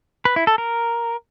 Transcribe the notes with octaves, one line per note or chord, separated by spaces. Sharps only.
B4
E4
A4
A#4